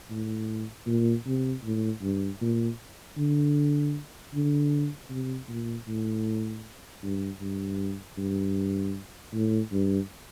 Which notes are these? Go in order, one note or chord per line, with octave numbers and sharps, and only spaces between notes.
A2
A#2
C3
A2
G2
A#2
D3
D3
C3
A#2
A2
G2
G2
G2
A2
G2